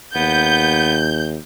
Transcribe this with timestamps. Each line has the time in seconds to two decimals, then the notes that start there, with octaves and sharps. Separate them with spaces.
0.15 D#2 B3 G6